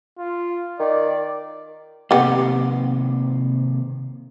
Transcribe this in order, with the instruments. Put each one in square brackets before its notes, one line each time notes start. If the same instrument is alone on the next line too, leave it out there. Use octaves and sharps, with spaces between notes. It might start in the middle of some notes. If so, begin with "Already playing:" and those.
[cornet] F4
[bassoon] D#3 [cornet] D5
[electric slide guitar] C3 D#3 A#3 [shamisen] B3 G4